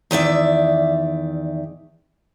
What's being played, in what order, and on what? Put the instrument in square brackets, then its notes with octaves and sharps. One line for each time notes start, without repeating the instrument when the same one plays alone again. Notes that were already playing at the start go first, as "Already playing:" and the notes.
[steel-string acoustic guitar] E2 D#3 D5 E5